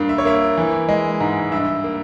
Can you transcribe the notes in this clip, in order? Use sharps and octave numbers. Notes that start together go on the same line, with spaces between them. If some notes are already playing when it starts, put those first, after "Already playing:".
Already playing: G2 A#3 F5
E5
C#5
A#3 E5
E3
G#3
G#2
G2 E5
A#3